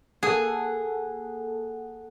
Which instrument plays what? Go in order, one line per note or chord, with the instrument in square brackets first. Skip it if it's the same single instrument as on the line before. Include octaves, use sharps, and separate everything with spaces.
[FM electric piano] A#3 A4 F#5 [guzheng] G#4